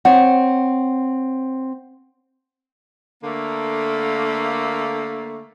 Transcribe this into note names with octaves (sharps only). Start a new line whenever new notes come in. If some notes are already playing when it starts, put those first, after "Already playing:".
C4 C5 C#5 F#5
D3 A3 A#3